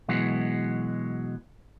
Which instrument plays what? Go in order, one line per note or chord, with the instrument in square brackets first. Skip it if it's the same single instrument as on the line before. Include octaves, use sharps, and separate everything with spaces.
[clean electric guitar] B2 E3 F#3 G#3